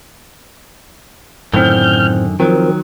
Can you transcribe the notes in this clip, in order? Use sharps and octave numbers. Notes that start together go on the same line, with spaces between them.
F#2 A2 D3 D#3 C4 F6 G6
D#3 F3 F#3 C4 A#4